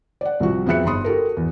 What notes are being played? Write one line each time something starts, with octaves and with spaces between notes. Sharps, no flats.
D5 F#5
C2 F3 F#4
F2 B3 G#4 E5 F#6 C#7
G1 D#4 B5 C6 D#6
F#4 G4 A4 A#4
E2